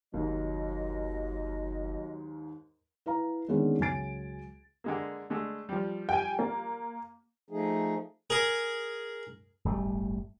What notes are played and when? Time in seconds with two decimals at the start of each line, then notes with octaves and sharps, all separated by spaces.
0.14 F#1 D#2 G#2 F#3 D#5
3.06 E4 B4 F5 A#5
3.48 D3 D#3 G#3 A#3 B3 C#4
3.79 C#2 F#3 G#3 G#5 A6 D7
4.84 D3 G#3 A#3
5.30 D3 G#3 A3
5.69 F3 G3
6.09 G5 G#5
6.39 A#3
7.50 F3 A3 D#4 G#4
8.30 G#4 A#4
9.65 D1 G1 G3 A3